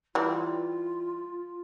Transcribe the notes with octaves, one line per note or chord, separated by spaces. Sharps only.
E3 G3 F4